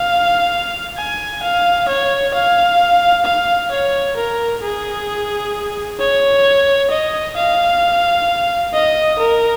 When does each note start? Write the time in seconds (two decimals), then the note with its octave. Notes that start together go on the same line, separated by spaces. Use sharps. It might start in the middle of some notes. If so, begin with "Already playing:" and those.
Already playing: F5
0.96 G#5
1.42 F5
1.88 C#5
2.33 F5
3.25 F5
3.71 C#5
4.16 A#4
4.62 G#4
5.99 C#5
6.90 D#5
7.36 F5
8.73 D#5
9.18 A#4